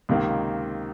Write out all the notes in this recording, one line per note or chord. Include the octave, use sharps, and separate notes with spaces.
C#2 C3 D#3 A#3